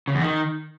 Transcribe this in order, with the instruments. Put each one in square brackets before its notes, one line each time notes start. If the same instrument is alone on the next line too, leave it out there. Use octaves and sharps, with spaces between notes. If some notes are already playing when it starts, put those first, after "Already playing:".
[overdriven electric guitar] C#3
E2
D#3